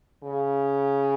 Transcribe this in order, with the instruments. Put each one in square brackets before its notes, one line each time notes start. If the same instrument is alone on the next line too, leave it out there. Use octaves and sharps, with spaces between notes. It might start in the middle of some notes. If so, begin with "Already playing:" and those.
[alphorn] C#3